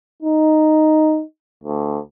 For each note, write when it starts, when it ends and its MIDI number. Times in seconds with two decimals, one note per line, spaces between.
0.22 1.22 63
1.64 1.98 38